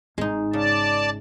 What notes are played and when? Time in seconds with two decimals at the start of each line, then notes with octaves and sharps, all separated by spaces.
0.18 G#1 G#2 G#3 D#4
0.53 C#3 D5 A5